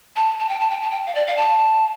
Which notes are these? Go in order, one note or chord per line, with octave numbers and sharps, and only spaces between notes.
A5
A5
G5
A5
G5
A5
G5
F5
D5
F5
A5